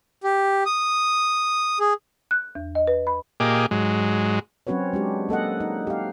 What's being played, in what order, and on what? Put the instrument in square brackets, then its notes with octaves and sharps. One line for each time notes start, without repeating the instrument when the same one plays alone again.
[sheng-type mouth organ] G4
D#6
G#4
[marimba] F#6
E2
D#5
B4
B5
[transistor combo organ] A#2 A#3 G4 G#4 D#5 D6
G#2 F#3 G#3
[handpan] F#3 C4 C#4 F#4 B4 C#5
G#3 D4 G4
A#3 A4 D#5 F#5
D#4
G4 F5